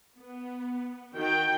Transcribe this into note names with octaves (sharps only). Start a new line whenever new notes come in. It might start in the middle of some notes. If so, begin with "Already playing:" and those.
B3
D#3 F#4 G5